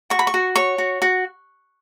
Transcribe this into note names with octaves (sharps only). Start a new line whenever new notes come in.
F#4 C#6
B5
C#6
F#4
C#5 C#6
F#4
F#4